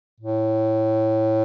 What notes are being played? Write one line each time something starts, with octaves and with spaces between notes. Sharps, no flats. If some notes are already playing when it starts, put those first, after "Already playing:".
A2